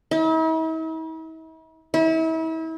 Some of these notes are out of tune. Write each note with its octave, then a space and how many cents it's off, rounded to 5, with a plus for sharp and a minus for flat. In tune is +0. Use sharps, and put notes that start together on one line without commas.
E4 -45
E4 -35